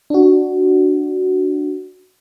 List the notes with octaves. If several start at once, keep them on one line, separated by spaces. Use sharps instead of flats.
D4 F#4